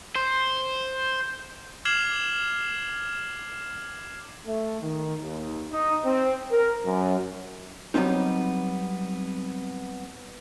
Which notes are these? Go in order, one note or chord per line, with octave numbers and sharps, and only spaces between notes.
C5
D6 F6 G#6 C7 E7 F#7
A3
D#3
D#2
D#4
C4
A#4
F#2
F#3 G3 B3 C4 D#4